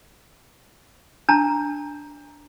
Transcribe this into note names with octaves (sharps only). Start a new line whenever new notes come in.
D4 A5 A#5